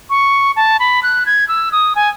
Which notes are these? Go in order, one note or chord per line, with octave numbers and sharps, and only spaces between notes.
C#6
A5
B5
F#6
G#6
E6
D#6
G#5